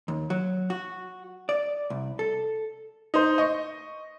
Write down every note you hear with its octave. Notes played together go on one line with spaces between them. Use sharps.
D#2
F#3
F#4
D5
C2
A4
D#4 C5
D#5 C#6